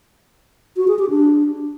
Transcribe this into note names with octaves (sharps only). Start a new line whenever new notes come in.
F#4
G#4
G4
D4